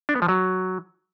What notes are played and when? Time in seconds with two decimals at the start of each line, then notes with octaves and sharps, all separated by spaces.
0.09 D4
0.15 B3
0.22 F3
0.28 F#3